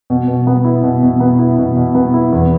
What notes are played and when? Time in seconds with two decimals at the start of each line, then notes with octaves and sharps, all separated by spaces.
0.10 B2
0.28 B2
0.47 B3
0.65 E4
0.83 B2
1.03 B2
1.20 B3
1.39 E4
1.58 B2
1.76 B2
1.95 B3
2.14 E4
2.32 E2